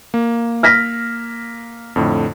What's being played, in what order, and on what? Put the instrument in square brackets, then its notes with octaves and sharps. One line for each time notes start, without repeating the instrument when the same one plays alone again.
[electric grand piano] A#3
[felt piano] F6 A#6 B6
[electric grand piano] F2 A2 D3